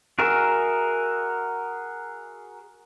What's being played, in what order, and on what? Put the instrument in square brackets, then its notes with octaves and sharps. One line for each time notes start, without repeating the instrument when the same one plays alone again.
[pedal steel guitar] F#4 G#4 A#4 E5